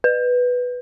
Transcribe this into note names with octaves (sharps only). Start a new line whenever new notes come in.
B4